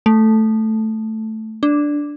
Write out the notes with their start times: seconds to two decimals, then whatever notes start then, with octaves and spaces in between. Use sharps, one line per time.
0.06 A3
1.63 D4